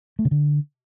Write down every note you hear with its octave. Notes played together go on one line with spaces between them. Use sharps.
A3
C#3
D3